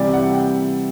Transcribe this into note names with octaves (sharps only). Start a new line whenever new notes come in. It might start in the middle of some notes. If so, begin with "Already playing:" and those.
Already playing: C3 E3 G3 D5
F#5
G5